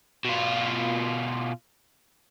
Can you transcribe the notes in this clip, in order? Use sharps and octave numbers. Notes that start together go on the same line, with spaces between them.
B2 F4